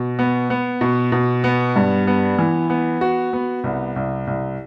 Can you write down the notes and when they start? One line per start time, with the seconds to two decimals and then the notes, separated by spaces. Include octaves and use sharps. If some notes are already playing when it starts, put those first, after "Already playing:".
Already playing: B2
0.19 B3
0.50 B3
0.81 B2
1.12 B2
1.44 B3
1.76 G2
2.07 B3
2.39 E3
2.70 B3
3.01 F#4
3.33 B3
3.64 C2
3.96 C2
4.27 C2